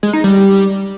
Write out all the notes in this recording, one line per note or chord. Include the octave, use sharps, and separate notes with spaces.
G#3
D#4
G3